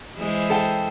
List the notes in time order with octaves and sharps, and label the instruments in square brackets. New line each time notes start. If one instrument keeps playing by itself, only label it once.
[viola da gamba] E3 G#3 C5
[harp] A4 G5